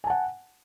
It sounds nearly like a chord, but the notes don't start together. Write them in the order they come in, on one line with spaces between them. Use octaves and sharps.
G#5 A5 F#5